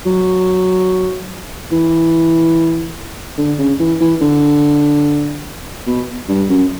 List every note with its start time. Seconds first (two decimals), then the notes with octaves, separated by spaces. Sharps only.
0.06 F#3
1.72 E3
3.38 D3
3.59 C#3
3.80 E3
4.01 E3
4.22 D3
5.87 B2
6.29 G2
6.50 F#2